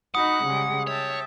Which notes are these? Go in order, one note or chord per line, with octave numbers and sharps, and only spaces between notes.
D#4 F#4 F#5 B5 D#6
C#3 G3 G#3
C#5 E5 G5 A5